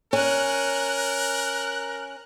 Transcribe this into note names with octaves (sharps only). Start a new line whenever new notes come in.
C#4 A#4 F#6